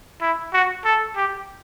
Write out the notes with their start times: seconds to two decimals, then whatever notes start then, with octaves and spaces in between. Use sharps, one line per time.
0.21 E4
0.53 F#4
0.85 A4
1.16 G4